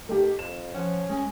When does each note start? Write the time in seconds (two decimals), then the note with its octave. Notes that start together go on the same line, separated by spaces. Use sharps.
0.09 D#3 A3 G4
0.39 F2 E7
0.74 F3 C#4 F#5
1.09 G#3 C#4 G#5